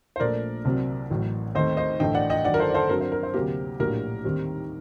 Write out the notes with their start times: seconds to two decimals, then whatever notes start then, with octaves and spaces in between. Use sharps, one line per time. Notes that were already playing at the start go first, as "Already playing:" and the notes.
0.16 C5
0.20 A#1 A#2 A3 A#4 D5
0.65 C2 C3 F#3 C4
1.11 A1 A2 F#3
1.55 D#2 D#3 A3 C4 C5 D#5
1.77 C5 D#5
2.00 A1 G2 D3 A3 D#5 G5
2.15 D5 F#5
2.30 D#5 G5
2.45 G2 D#3 F#3 D5 F#5
2.54 A#4
2.59 A4 C5
2.70 D5
2.74 A4 C5
2.89 G2 F#3 C4 A#4
3.01 C5
3.12 A#4
3.23 C5
3.34 D2 C3 F#3 A#3 G4 A#4
3.80 A#1 A2 F#3 A#3 D4 G4 A#4
4.24 D#2 D#3 G3 C4